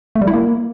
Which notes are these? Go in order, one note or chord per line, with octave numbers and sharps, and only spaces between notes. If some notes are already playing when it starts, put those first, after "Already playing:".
A3
G3
E4
A#3